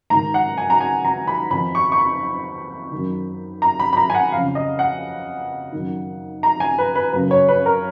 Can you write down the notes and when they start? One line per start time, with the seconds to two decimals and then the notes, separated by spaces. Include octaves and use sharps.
0.10 G#2 D#3 A#5
0.34 F#5
0.58 G#5
0.70 A#5
0.81 G#5
1.05 A#5
1.28 B5
1.51 F2 D#3 B5
1.75 C#6
1.92 C#6
1.98 B5
2.92 F#2 D#3
3.62 A#5
3.80 B5
3.93 B5
3.97 A#5
4.10 G#5
4.15 F#5
4.32 F2 C#3 F5
4.55 D#5
4.79 F#5
5.73 F#2 D#3
6.43 A#5
6.60 G#5
6.78 B4
6.95 B4
7.13 F#2 C#3 B4
7.31 C#5
7.48 B4
7.66 A#4